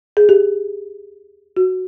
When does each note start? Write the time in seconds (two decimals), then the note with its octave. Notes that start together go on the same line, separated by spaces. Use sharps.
0.17 G#4
0.29 G4
1.57 F#4